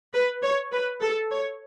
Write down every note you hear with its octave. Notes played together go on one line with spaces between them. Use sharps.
B4
C#5
B4
A4
C#5